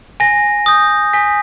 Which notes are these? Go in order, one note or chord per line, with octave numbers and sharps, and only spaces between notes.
G#5 A#6
D#6 G6
G#5 B6